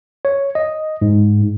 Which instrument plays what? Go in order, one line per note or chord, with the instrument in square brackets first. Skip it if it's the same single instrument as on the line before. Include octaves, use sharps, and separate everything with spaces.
[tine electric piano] C#5
D#5
G#2